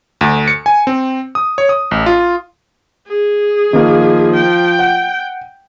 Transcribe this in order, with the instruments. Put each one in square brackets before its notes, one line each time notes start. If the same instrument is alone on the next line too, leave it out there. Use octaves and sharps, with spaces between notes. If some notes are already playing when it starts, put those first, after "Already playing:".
[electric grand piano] D2
C#7
G#5
C4
D#6
C#5
D#6
A1
F4
[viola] G#4
[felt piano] D#3 A#3 [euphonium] F3
[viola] G5
[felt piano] F#5